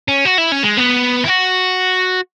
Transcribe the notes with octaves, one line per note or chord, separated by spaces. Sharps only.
C#4
F#4
E4
C#4
G#3
B3
E4
F#4